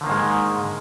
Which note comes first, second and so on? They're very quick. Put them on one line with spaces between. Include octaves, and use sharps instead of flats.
D3 D#3 A#3 G#2 G#3